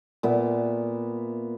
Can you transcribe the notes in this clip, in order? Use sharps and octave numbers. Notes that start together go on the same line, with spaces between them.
A#2 B3 E5